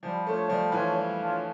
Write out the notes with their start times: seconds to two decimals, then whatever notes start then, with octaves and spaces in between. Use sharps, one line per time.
0.03 F3 G3
0.26 A3 D4 F4 C#5
0.49 F3 G3
0.72 E3 D4 F4 C#5
0.96 G3
1.19 D4 F4 C#5